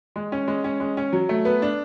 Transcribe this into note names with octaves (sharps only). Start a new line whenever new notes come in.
G#3
C#4
G#3
C#4
G#3
C#4
F#3
A3
B3
D4